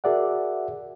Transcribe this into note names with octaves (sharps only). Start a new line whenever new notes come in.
F#4 G#4 A#4 D5 E5 F#5